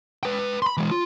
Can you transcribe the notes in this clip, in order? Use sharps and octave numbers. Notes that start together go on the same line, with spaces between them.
B4 G5
B5 C6
E3 G#3
F4